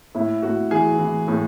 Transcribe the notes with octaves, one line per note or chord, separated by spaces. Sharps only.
A2 E4
A2 F#4
E3 G#4
E3
A2